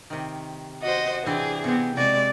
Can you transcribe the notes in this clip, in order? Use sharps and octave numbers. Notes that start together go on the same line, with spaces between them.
C3 D#3
F#4 C5 D#5
C3 E3 C4 D4 G#4
C3 B3 C4
C3 G#3 F#4 D5 G#5